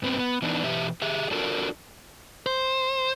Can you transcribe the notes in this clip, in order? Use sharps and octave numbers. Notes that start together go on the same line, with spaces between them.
G2 B3 C4
B3
E3 B3 D4 D#4
B2 E3 G4 E5
G4 G#4 E5
D4 F4 F#4 A4 A#4
C5